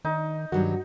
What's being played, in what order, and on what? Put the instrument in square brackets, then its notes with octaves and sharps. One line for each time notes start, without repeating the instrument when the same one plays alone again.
[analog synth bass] D#3 [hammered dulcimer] D#4
[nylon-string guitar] G2 F#3 G3 [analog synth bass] D#3 [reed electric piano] F#4